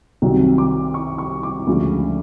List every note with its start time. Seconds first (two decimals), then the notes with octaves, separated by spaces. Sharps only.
0.22 C2 C3 D#3 F#3
0.58 D6
0.94 C#6
1.18 C#6
1.43 D6
1.67 D2 C#3 F3 G#3